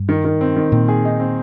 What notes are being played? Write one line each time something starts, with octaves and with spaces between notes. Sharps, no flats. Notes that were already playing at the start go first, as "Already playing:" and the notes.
Already playing: G2
D#3
D#3
C4
D#3
A#2 C4
G#4
D#4
C4